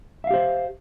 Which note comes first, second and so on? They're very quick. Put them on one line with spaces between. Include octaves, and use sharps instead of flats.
E5 F5 G4 C5